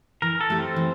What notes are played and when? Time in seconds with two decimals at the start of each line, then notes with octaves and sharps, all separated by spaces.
0.22 E3 A#4
0.41 A4
0.50 A3 E4 G4
0.58 C4
0.76 E3